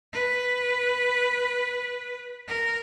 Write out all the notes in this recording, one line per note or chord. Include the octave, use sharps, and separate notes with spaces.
B4
A#4